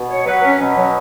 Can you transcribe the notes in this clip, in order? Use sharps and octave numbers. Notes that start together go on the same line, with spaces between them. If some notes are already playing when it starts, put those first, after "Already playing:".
Already playing: B2
C#5
F#3 B4
C#4
B2 F#3
F#3